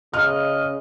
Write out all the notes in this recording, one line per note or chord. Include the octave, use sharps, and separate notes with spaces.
C#3 D#5 F6